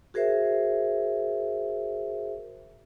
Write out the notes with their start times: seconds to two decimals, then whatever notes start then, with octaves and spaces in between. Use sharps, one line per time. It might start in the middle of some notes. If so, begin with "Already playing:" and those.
0.14 F#4 G#4 A#4 C5 E5